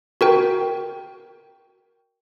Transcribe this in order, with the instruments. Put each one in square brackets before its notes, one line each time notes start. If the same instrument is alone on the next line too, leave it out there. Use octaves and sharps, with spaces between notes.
[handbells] F#4 A#4 G5